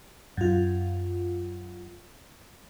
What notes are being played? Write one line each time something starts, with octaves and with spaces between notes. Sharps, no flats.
F#2 F4